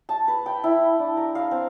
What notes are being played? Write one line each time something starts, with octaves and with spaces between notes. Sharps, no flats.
A5
B4
G5
E4
D4
A#4
F5
C4